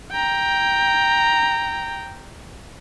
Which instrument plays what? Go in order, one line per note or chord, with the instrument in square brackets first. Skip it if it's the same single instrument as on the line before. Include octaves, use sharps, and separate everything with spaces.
[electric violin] G5 A#5